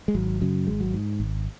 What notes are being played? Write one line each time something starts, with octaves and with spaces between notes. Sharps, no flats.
G#3
G#1 F#3
F#2 C#3 F#3
G#1 G#3
F#3
G#2
G#1